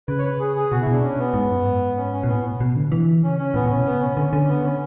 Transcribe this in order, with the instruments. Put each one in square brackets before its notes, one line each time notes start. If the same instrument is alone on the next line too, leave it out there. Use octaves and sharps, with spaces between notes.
[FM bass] C#3 [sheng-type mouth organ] B4
[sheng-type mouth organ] C#5
B4
G#4
G#4
[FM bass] B2 [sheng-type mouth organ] F#4
[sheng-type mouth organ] E4
[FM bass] B2
[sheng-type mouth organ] D4
C#4
B3
[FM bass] G#2
F#2
G#2
[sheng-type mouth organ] C#4
C#4
[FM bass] B2
[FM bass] A2 [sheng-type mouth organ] B3
[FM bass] B2
D3
E3
[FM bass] C#3 [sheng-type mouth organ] C#4
[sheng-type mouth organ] C#4
[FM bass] A2 [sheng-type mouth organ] B3
[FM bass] A2
[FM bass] B2 [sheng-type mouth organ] C#4
[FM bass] C#3 [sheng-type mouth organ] B3
[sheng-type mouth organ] C#4
[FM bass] D3 [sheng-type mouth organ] C#4
[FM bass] D3 [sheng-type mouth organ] C#4
[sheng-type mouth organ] B3
C#4